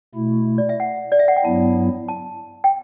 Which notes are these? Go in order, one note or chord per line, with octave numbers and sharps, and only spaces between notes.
B2 A3 E4
D5
E5
F#5
D5
E5
F#5
G5
G2 F#3 B3 E4 A5
A5
G5